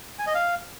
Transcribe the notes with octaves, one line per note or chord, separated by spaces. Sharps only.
G#5
D#5
F5